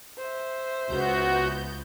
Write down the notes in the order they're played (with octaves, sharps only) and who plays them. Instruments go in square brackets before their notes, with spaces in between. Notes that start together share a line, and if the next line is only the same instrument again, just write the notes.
[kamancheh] C5 E5
[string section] C#2 B3 G6 [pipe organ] F#4